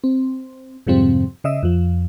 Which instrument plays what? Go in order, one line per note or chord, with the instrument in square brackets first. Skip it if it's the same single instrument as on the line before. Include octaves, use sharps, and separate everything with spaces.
[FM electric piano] C4
F2 G#2 C3 F3 G3 C4
C#3 D#5 E5 E6
F2 F3